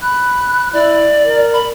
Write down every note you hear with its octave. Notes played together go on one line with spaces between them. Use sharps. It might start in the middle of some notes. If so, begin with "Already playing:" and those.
B5 F#6
E4 D5
A#4
B5